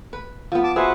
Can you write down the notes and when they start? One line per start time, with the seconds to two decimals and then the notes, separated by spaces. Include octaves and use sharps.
0.13 B4
0.52 F3 B3
0.63 A5 D6
0.76 F#4 G#4 B4 C5 E5